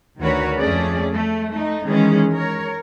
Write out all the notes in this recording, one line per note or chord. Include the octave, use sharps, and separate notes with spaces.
D2 D#3 F#4 A#4 B4 C#5
F2 A3 C#4 G#4 D5
A3
A3 D#4
D#3 E3 G#3 C#4 G#4
A#4 C#5